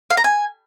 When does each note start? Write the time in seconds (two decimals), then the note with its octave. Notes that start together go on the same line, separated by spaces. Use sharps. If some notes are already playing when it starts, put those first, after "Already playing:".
0.10 F5
0.17 A#5
0.24 G#5